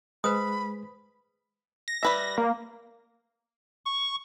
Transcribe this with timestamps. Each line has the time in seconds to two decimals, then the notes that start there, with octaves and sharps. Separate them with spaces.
0.24 G#3 B4 C5 B5 D#6
1.88 A#6
2.03 G3 B4 E5
2.38 A#3
3.85 C#6